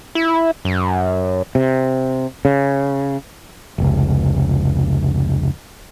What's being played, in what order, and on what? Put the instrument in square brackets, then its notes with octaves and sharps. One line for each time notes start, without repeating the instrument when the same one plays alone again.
[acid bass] E4
F#2
[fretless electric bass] C3
C#3
[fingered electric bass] F1 C#2